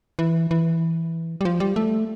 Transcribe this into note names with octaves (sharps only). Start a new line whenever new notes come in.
E3
E3
G3
F3
G3
A3